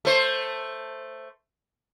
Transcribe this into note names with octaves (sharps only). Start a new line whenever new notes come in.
A3 C5